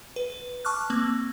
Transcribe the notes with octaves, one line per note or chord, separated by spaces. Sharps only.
B4
A5 C#6 D6 F6 F#6
A#3 C4